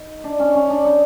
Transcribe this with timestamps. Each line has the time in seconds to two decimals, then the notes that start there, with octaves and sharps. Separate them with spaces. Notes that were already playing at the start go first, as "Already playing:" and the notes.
Already playing: D#4
0.24 D4
0.40 C#4
0.55 C#4
0.70 D4
0.85 D#4